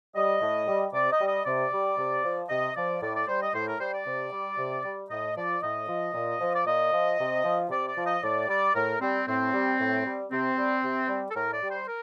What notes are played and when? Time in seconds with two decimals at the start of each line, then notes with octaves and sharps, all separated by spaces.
0.15 G3 D#5
0.41 A2
0.67 G3
0.93 C3 D5
1.11 D#5
1.20 G3
1.27 D#5
1.45 C3 D5
1.72 G3
1.98 C3
2.23 F3
2.49 C3 D#5
2.75 F3 D5
3.01 A2 D5
3.14 D5
3.28 G3 C5
3.41 D#5
3.53 A2 C5
3.67 A#4
3.79 G3 C5
3.92 D5
4.06 C3
4.32 G3
4.58 C3
4.84 G3
5.10 A2 D#5
5.36 F3 D5
5.62 A2 D#5
5.87 F3
6.14 A#2
6.40 F3
6.55 D5
6.66 A#2 D#5
6.92 F3
7.18 C3
7.44 F3
7.70 C3 D5
7.87 D5
7.96 F3
8.05 D#5
8.22 A2 D5
8.48 G3 D5
8.74 A2 A#4
9.00 G3 C4
9.26 A2 C4
9.53 G3
9.79 A2
10.04 G3
10.30 C3 C4
10.57 G3
10.83 C3
11.08 G3
11.30 A4
11.34 A2 A#4
11.53 D5
11.61 G3
11.70 C5
11.87 A#4